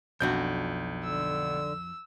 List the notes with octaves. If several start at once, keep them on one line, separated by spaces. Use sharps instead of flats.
B1 F2 D4 F#4 G6
D3 E6